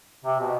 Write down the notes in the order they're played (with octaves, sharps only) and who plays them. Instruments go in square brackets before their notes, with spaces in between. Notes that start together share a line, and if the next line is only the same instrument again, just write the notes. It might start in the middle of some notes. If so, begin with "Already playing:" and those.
[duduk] C3
B2